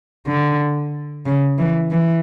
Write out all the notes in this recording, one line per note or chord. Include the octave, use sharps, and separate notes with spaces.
D3
C#3
E3
E3